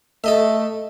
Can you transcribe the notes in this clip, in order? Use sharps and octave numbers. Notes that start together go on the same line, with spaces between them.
A3 A4 D#5 E5